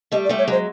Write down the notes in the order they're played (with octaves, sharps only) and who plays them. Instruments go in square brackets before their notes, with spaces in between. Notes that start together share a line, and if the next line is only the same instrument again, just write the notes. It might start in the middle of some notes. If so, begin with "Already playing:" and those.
[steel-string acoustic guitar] G3 A3 [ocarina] D#5
[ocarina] D5
[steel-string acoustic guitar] G3 A3
[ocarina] C#5
[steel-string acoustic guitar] F#3 G#3 [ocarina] C5